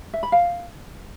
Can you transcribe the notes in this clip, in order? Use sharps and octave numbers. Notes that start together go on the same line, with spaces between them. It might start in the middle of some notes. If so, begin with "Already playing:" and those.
E5
B5
F5